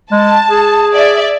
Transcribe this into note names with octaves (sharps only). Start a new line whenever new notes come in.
G#3 A5
G#4
D5 E5